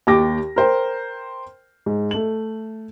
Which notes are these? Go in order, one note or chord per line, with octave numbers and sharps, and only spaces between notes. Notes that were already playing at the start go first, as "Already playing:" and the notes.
D#2 G4 G5 D6 A#6
A#4 C5 G5
G#2
A3 F#7